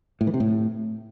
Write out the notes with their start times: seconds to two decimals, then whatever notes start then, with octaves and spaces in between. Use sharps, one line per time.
0.21 A2
0.27 E3
0.34 C3
0.40 A2